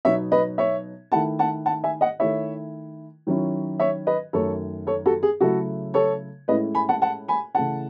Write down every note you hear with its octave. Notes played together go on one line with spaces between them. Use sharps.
B2 F#3 B3 D#4 C#5 E5
B4 D#5
C#5 E5
D#3 A3 E4 F#5 A5
F#5 A5
F#5 A5
E5 G#5
D#5 F#5
D#3 A3 E4 C#5 E5
D#3 F#3 C#4 E4
C#5 E5
B4 D#5
F#2 D#3 A3 A4 C#5
A4 C#5
F#4 A4
G#4
C#3 F#3 A3 E4 F#4 A4
A4 C#5
A2 G#3 C#4 E4 B4 D#5
G#5 B5
F#5 A5
F#5 A5
G#5 B5
C#3 E3 A3 E4 F#5 A5